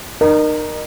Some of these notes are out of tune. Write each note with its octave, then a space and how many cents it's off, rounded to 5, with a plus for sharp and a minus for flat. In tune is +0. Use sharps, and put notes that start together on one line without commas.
D#4 -35 A#4 +10